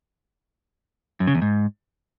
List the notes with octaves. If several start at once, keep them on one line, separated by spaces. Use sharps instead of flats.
F#2
C#3
E2
G#2